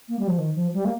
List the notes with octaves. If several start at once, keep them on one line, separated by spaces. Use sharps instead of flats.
A#3
G3
F3
D#3
F3
G3
A#3